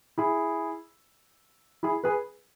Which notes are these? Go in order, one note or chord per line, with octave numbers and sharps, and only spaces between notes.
E4 G#4
E4 G#4
G#4 B4